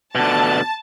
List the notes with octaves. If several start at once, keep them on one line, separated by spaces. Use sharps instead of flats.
B2 D3 A5